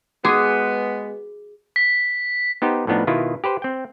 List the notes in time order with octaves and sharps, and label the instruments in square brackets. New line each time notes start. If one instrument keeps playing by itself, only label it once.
[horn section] G#3 B3 [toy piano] F#4 D6 [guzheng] G#4
[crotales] B6
[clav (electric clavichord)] B3 D#4 G4 C5
A2 F3 B3 D4 D#4
B2 D#3 E4 F4 B4
G4 B4 C5
C4 G5